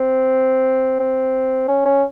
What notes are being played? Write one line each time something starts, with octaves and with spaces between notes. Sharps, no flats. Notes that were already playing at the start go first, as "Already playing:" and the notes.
Already playing: C4
C4
C#4
C#4